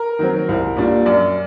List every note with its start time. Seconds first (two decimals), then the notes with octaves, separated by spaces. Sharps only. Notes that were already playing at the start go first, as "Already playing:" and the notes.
Already playing: A#4
0.19 D#3 F#3 C4
0.49 C2
0.76 A#2 G3 D4
1.06 F#2 D5